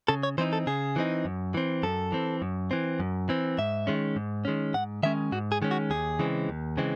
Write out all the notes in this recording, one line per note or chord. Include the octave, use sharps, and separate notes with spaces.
C#3 A4
C#5
E3 C4 D#4 C5
A4
C#3 G#4
E3 C4 D#4
F#2
E3 C4
F#2 A4
E3 C4
F#2
E3 C4
F#2
E3 C4
G#2 E5
D#3 G#3 C#4
G#2
D#3 G#3 C#4
G#2 F#5
D#3 G#3 C#4 E5
G#2 F#4
G#4
D#3 G#3 C#4
F#4
D#2 G#4
C#3 E3 G#3 C4
D#2
C#3 E3 G#3 C4